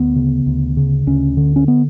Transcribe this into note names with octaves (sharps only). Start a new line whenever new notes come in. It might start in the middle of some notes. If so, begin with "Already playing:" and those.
Already playing: D2 B3
C#3
D2
C#3
D2 C#4
D3
C#4
B3